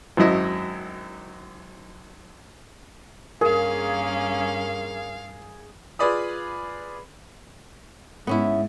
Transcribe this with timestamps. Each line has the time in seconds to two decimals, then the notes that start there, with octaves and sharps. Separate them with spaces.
0.17 G#1 F#2 F#3 E4 D#5
3.41 G2 A#3 C#4 G#4 A#4 F5
5.99 F4 G#4 B4 D5 B5 D#6
8.27 G#2 B3 C#4 E4